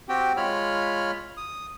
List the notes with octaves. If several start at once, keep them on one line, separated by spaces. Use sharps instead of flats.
C4 F#4 G4 G5
G#3 F4 C#5 B5 F6
D#6